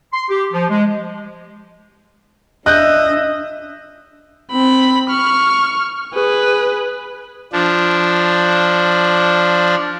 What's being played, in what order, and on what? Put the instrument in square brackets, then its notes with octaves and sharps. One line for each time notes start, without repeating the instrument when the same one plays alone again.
[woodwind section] C6
G4
F3
G#3
[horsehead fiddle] D4 E5 [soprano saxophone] D#5 [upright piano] F#6 G6
[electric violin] C4 B5
C#6 F6
G#4 B4
[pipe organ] F3 D4